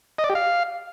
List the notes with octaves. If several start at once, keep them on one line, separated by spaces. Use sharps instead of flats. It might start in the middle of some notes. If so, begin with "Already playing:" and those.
D#5
D5
G4
F5